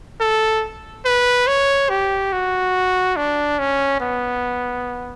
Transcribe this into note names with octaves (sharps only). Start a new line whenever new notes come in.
A4
B4
C#5
G4
F#4
D4
C#4
B3